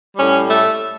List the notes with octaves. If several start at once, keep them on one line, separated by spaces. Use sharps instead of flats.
A2 G3 C#4
A3